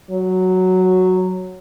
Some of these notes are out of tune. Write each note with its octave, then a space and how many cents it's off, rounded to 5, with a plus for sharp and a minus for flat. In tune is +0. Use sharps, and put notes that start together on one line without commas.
F#3 +0